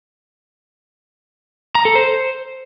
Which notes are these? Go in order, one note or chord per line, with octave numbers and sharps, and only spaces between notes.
A#5
A4
C5